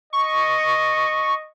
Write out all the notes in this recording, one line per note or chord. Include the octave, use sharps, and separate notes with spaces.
D#5 C#6